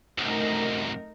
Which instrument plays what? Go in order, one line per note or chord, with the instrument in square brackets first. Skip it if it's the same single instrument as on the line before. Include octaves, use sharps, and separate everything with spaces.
[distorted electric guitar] C2 F#2 [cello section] A3 D#4 A#4